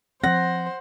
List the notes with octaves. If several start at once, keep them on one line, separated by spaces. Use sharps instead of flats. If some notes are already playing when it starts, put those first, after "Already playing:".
F3 C4 C5 F#5 A#6